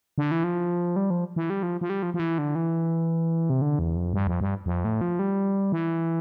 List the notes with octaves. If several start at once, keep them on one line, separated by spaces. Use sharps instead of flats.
D3
E3
F3
G3
F3
E3
G3
F3
F3
G3
F3
F3
E3
D3
E3
C3
D3
E2
F2
G2
F2
G2
F2
A2
F3
G3
E3